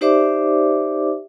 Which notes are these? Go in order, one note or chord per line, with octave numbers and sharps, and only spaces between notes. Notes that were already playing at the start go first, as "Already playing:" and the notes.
D#4 G4 C5 D5 E5 D6